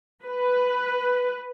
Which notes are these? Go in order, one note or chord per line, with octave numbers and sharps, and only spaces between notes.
B4